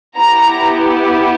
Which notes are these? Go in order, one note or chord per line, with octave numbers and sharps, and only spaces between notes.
B3 E4 G4 A#5